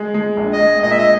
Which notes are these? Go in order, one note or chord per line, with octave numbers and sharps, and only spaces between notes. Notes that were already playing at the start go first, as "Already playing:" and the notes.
Already playing: G#3
G#3
A#1
D#5
G#3
A#2 D#5
E5
D#5